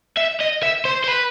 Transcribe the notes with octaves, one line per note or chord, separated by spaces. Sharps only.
E5
D#5
E5
C5
C5
B4